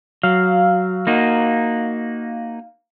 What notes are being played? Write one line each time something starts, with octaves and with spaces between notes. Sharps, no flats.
F#3 F5
A#3 D#4 F#4